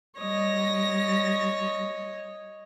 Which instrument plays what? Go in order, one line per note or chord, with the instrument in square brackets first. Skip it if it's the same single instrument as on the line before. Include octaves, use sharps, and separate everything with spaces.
[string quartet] G3 A#6 [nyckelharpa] C#5 D#5